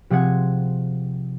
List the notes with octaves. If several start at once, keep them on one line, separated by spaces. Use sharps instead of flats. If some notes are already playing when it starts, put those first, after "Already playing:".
C3 F3 C4 G#4 F#5 G#6